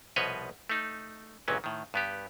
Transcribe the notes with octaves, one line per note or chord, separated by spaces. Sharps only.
C2 B2 F3 B4 C#5 D#5
A3 D#4
G1 C#2 A#2 F#3 C#4
A2 D#3
G2 B3 G4